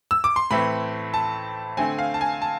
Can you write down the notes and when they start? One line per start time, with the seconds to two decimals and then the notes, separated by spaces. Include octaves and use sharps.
0.11 E6
0.24 D6
0.36 C6
0.51 A2 E3 A3 C4 B5
1.14 A5
1.77 D3 A3 C4 G#5
1.99 F5
2.14 A5
2.21 G#5
2.42 A5